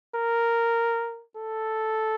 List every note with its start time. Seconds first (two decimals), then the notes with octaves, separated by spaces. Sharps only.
0.15 A#4
1.36 A4